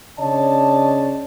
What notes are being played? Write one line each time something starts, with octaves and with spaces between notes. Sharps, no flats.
C#3 D4 C#5 D#5 A5